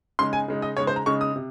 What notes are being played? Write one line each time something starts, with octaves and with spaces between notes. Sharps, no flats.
C#3 G#3 D#4 C6
G#5
C#3 G#3 D#4
D#5
C#3 G#3 D#4 C#5
C5
A#5
C#3 G#3 D#4 C#6
D#6
C3